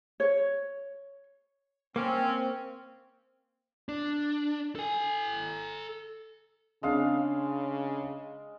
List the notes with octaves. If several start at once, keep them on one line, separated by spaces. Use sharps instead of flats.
C#5
A#3 C4 C#4
D4
A4 G#5
C#3 G#3 C4 D4 F5